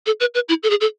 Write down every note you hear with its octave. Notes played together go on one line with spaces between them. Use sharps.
A4
B4
B4
E4
A4
G#4
A4